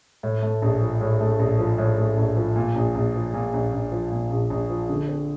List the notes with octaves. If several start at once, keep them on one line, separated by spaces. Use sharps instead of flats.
A2
A3
A#1
F3
A2
A3
A#1
F3
A2
A3
A#1
F3
A#2
A#1
A#1
F3
A#2
A#1
A#1
F3
A#2
A#1
A#1
F3
D3
C4